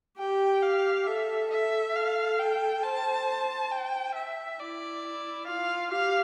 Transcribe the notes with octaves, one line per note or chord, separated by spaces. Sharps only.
G4 G5
F5
A4 E5
E5
A4 F5
G5
C5 A5
G5
E5
E4 D5
F4 F5
G4 F5